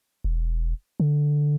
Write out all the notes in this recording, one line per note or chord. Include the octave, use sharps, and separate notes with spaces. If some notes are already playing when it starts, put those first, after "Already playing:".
E1
D3